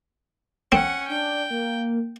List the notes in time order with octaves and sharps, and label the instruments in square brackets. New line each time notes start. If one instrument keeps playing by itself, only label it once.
[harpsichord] C4 [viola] C#4 F#5
[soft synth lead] D4 [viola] G5
[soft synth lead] A#3